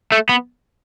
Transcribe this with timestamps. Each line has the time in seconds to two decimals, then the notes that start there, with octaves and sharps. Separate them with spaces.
0.12 A3
0.29 B3